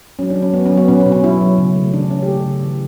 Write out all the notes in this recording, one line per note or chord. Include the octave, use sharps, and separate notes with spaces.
F#3 C#4
D4
F#3
C#4
F#3 B3
C#4
F#3
B3
B2 C#4
C#4
B2
C#4
F#3 E4
F#3
C#3
A3
E3 D4
C#3 C#4
G4
A3 A4
C#3
E3